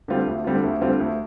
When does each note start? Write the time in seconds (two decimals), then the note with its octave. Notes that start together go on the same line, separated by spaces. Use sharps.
0.08 D3 G3 C4 F4
0.27 D2
0.44 D3 G3 C4 F4
0.63 D2
0.81 D3 G3 C4 F4
1.00 D2